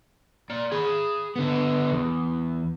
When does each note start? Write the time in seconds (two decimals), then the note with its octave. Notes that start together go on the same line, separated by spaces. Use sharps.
0.50 A#3 D5
0.72 G#4 B5
1.36 D3 B3
1.92 E2